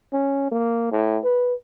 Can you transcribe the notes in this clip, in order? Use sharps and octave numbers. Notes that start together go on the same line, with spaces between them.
C#4
A#3
A2
B4